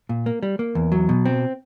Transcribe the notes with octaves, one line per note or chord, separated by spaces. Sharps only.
A#2
A#3
G3
A#3
E2
F#3
B2
C4